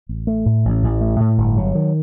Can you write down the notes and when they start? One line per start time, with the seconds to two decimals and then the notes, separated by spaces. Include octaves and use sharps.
0.09 A1
0.27 A3
0.46 A2
0.65 A1
0.83 A1
1.01 A3
1.20 A2
1.38 G1
1.57 F#3
1.75 D#3